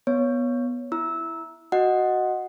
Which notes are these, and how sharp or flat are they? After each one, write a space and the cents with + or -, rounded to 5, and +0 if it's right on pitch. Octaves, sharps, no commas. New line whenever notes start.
B3 -10 C#5 +5
E4 +0 E6 -15
F#4 +0 D#5 +0 F#5 +0